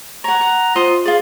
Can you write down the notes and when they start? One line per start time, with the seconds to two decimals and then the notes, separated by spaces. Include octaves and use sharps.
0.24 C#5 F#5 A#5
0.41 F#5
0.76 F4 C5 D#5 D#6
1.06 F4 G#4 D5